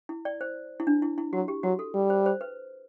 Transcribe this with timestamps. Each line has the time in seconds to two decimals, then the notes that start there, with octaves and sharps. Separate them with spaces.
0.09 E4
0.25 D5
0.41 C5
0.80 E4
0.87 D4
1.02 E4
1.18 E4
1.33 F#3 F#4
1.48 G4
1.63 F#3 F#4
1.79 A4
1.94 G3
2.10 C5
2.26 C5
2.41 B4